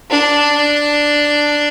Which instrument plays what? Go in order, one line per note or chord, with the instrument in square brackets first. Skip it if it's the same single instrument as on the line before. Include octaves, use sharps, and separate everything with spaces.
[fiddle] D4